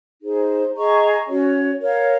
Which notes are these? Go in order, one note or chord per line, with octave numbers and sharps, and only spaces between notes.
D#4 G#4 C5
G#4 D#5 A#5 C#6
C#4 F#4 C#5
A#4 C#5 F5